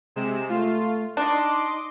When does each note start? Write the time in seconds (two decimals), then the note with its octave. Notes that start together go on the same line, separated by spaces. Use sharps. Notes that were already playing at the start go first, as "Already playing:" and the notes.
0.16 C3 G#3 E7
0.49 A3 F4
1.17 D4 D#4 D#5 C6 D6